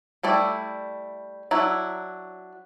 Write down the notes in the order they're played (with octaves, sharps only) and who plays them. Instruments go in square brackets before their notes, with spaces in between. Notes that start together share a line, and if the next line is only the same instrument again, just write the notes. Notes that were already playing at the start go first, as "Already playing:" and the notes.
[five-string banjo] G3 A3 E4 D5
F#3 D4 E4